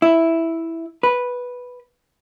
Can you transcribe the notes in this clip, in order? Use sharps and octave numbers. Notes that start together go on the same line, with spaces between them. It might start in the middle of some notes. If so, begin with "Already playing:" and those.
E4
B4